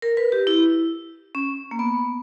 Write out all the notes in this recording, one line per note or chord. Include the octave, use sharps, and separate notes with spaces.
A#4
B4
G4
E4
C#4
A#3
B3